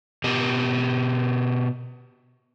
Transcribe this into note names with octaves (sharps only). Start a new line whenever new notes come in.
B2 G4 D#5